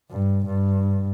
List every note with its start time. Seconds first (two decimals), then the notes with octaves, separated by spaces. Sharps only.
0.10 G2
0.46 G2